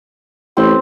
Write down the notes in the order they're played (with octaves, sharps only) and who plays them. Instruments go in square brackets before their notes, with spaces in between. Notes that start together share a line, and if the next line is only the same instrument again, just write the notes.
[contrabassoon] A1 [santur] C4